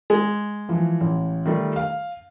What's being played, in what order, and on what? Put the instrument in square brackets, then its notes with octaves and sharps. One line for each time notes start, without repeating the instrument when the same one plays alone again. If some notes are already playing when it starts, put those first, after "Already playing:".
[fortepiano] G#3
[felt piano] E3 F3
A1
D#3 G3 A3
F5